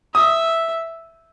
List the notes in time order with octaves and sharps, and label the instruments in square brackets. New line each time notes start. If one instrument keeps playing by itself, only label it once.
[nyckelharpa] E5 [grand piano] D#6